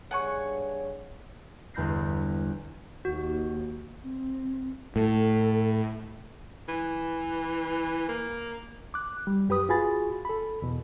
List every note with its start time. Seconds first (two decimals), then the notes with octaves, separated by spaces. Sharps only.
0.11 G2 G#4 C#5 F#5 G#5 C#6
1.74 G1 E2 B5 G6 A#6 C7
3.05 D#2 F#4
4.04 C4
4.96 A2 A4
6.68 E3
8.09 A#3
8.94 D6 F#6
9.27 G3
9.49 F#2 G4 B4 D#6
9.69 F4 F#4 G#4 G#5 B5 A6
10.25 A4 B5
10.62 E2 B2